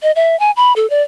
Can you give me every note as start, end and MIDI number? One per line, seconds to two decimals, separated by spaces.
0.03 0.12 75
0.16 0.38 76
0.40 0.51 80
0.57 0.73 83
0.76 0.89 69
0.90 1.02 74